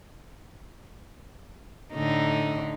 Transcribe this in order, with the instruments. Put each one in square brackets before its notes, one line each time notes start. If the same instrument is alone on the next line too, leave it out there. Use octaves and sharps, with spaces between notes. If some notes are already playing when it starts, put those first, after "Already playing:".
[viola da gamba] A2 D3 D#4